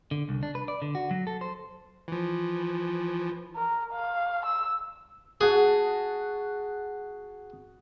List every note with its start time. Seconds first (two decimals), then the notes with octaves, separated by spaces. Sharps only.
0.11 D3
0.29 C2
0.43 D4
0.55 B4
0.68 D5
0.82 D3
0.95 F#4
1.11 F#3
1.27 A4
1.41 C5
2.08 E3 F3
3.56 A#4
3.93 F5
4.46 E6
5.41 F#4 G#4 F#5 A5